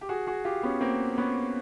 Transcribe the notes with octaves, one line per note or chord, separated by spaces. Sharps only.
G4
F#4 G#4
F#4 G#4
F4 G4
B3 C#4
A#3 C4
B3 C#4